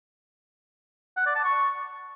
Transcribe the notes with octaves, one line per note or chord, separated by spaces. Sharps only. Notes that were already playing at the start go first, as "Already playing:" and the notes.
F#5
D5
A5
C#6